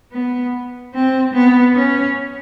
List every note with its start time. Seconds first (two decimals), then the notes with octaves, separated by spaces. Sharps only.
0.12 B3
0.94 C4
1.34 B3
1.75 C#4